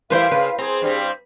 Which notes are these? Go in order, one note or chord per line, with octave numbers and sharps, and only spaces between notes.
E3 G3 E4 B4 C5 F5 G5
C#3 B4
C4 G#4 A#5
G2 G3 C4